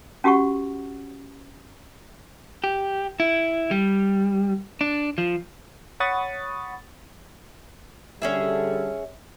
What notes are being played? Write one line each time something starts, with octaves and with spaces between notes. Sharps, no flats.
C#4 F#4 G4 F#5 C#6
G4
E4
G3
D4
F3
C#5 F#5 B5 C#6 D#6 A6
D3 G3 C#4 G#4 A4 E5